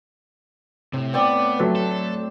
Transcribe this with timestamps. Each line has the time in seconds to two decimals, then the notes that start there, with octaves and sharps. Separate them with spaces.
0.93 A2 C3
1.14 B3 C4 C5 D5
1.59 F#3 A3 B4 C6
1.76 A4